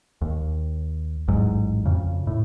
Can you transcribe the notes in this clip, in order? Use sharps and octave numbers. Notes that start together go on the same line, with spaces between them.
D#2
A1 E2 G#2 F#3
F2 C#3
A2